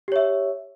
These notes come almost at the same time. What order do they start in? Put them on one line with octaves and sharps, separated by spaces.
G4 C#5 E5